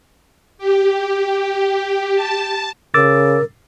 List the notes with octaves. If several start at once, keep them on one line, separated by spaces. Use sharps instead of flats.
G4
A5
C#3 A#4 D6 E6 A6